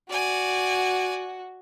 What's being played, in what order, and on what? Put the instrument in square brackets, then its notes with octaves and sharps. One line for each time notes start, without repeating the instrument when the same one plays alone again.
[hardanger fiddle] F#4 [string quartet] D5 G#5